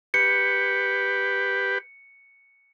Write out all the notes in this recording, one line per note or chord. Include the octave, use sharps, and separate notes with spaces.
G4 B4 C#7